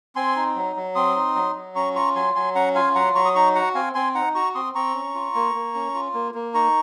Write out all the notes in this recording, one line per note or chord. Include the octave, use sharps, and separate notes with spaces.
C4 G#5 C6
D#4
F#3
F#3
C4 C6 D#6
D#4
F#3
F#3
C#4 A#5 C#6
F4 A#5 C#6
F#3 G#5 C6
F#3 G#5 C6
C#4 F#5 A#5
F4 F5 G#5
F#3 F#5 A#5
F#3 A#5 C#6
D#6
D#4 A#5 C#6
F#4 F#5 A#5
C4 F5 G#5
C4 G#5 C6
D#4 F#5 A#5
F#4 A#5 C#6
C4 C6 D#6
C4 A#5 C#6
C#4
F4
A#3
A#3
C#4
F4
A#3
A#3
D#4 A#5 C#6